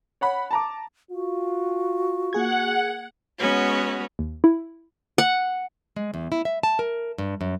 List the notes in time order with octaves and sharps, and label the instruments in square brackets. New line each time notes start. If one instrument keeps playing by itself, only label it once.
[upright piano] C#5 F#5 B5
A5 A#5 D6
[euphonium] F4 [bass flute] F#4
[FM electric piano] A#3 G#4 G#6 [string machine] F#5
[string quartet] G#3 B3 C#4 F#4 C#5
[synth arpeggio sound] D#2
E4
[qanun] F#5
[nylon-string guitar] G#3
E2
E4
E5
A5
A#4
G2
F#2